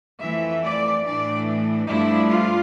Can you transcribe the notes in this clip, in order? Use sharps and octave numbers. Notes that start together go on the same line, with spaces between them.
F2 E3 A3 E5
D5
A2 E3 A3 D4 D5
G2 F3 A3 D4 E4
F4